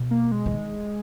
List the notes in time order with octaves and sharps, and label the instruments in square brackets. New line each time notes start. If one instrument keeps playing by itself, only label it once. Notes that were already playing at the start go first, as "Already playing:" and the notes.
Already playing: [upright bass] B2
[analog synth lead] A#3
G#3
[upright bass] E3
D#3